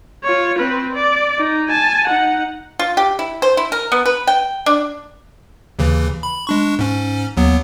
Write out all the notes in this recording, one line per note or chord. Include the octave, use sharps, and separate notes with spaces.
F4 C#5
C4 B4
D5
D#4
G#5 A5
D#4 F#5
F4
G4
E4
C5
E4
A#4
B3
B4
G5
D4
D#2 C#3 E3
B5
G#3 D4 C#6
G#2 C#4
D#2 F#3 B3